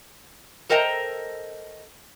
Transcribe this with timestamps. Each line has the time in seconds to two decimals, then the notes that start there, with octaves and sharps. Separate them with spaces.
0.69 A4 A#4 C5 D#5 G5 A#5